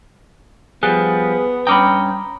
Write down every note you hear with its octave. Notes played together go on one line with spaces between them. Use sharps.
F3 G3 B3 G#4 F#6
G2 C#4 G5 A#5 B5 D6 D#6